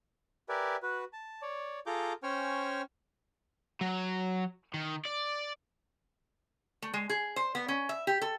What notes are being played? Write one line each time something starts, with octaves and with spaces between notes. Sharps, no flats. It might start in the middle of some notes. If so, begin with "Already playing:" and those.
G4 A#4 B4 D5 E5 G#5
F#4 B4
A5
C#5 D5
F4 G#4 A4 A#5 D6 G6
C#4 C5 G5 G#5 C#6 F6
F#3
D#3
D5
A3
G#3
G#4
C5
B3
C#4
E5
G4
A4